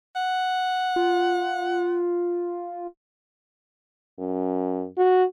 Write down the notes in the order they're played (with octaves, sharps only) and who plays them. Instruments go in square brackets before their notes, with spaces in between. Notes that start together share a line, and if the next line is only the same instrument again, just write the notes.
[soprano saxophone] F#5
[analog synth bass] F4
[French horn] F#2
F#4